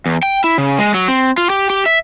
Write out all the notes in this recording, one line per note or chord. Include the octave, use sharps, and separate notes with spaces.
E2
G5
E4
C#3
G#3
F#3
C4
F4
G4
G4
E5